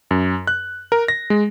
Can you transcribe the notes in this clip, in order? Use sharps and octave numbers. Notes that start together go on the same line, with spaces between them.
F#2
F#6
A#4
A#6
G#3